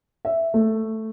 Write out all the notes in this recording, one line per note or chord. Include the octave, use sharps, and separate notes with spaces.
E5
A3